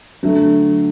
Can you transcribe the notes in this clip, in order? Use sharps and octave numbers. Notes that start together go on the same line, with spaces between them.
D3 F#3 A3